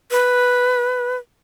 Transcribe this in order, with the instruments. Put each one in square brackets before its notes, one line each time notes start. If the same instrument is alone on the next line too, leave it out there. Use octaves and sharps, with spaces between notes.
[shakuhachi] B4